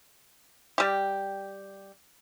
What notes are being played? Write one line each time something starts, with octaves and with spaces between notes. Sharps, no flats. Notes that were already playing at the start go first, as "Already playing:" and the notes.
G3 G4